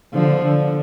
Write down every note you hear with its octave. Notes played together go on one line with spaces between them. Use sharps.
D3 F3
D3